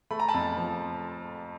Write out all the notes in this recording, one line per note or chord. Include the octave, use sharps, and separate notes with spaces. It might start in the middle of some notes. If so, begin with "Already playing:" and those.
A3 B5
A#5
A5 B5
F2
F3